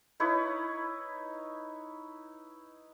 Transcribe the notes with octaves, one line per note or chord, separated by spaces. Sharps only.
D#4 E4 B4 C#5